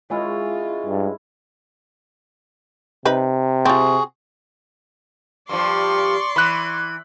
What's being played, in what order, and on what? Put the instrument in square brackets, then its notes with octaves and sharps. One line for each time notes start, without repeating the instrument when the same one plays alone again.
[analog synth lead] G#3 [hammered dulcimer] C#4 E4 [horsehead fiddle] F4
[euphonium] G2
[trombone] C3 [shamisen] D#4 B4
[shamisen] C4 F4 [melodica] F#4 G#4
[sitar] G2 F3 [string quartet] D5 C6 C#6
[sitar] E3 [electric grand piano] B5 F#6